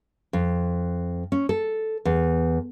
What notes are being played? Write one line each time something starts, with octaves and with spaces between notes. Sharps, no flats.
F2
C#4
A4
E2